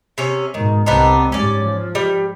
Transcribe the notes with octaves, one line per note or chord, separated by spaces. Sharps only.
C3 C#4
G#2 B2 D#3
C2 B3 C4 D4 D#4
G#2 G3 C#4 D5
F3
G3